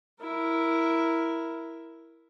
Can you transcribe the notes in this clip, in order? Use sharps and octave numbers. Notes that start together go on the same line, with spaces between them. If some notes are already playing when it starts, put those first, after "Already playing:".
E4 A#4